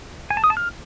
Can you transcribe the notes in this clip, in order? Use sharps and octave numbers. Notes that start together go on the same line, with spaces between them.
G#5
A5
D#6
A5
F6